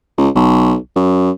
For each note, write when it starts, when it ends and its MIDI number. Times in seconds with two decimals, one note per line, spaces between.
0.18 0.29 37
0.35 0.75 35
0.96 1.31 42